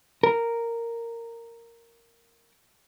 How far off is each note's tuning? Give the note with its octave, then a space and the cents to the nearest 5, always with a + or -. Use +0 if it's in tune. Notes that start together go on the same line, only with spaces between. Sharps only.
A#4 -10